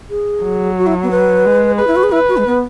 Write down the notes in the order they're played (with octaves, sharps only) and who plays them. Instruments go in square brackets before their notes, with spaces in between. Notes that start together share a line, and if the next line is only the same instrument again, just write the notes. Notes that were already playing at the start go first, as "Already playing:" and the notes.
[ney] G#4
[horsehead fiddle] F#3
[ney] F#4
E4
B3
B4
[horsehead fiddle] G#3
[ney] G#4 [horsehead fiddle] B4
[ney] E4
F#4
G#4
[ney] E4 [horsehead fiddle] B4
[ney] F#4
G#3
B3